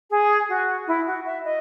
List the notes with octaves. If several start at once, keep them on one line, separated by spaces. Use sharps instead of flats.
G#4
F#4
E4
F#4
E5
D#5